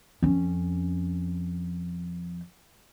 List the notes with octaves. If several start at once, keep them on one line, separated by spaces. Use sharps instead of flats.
F2 C#4